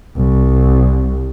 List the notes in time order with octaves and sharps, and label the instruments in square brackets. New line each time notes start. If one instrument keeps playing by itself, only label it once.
[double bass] C2